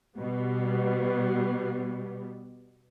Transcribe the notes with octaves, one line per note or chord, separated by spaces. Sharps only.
B2 G3 B3